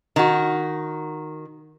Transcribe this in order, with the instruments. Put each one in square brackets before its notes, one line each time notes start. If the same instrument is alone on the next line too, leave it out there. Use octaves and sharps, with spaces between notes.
[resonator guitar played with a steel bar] D#3 F#4